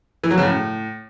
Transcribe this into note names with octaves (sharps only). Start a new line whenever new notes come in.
E3
F#3
C#3
A2